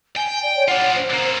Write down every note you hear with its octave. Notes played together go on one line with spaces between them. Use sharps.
G5 G#5
D5
C#5
D4 F4 F#5
C5
A#3 C4